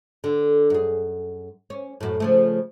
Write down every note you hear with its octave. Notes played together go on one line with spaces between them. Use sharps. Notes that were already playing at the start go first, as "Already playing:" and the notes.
D3
F#2 G#4
C#4
F#2 A2
C#3 F3 A3